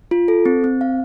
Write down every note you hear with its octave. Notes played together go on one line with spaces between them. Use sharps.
F4
A4
C4
C4
F5